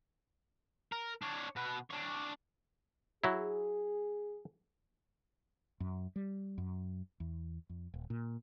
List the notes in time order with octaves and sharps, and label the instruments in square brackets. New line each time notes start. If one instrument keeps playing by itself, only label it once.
[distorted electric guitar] A#4
D4 C#5
B2 B4
D4 C#5
[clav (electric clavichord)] F#3 E4 [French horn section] G#4
[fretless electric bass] F#2
G3
F#2
E2
F2
D#1
A#2